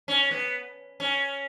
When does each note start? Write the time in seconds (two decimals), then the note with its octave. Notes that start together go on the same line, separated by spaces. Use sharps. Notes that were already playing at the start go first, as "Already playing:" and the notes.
0.08 C#4
0.31 B3
1.00 C#4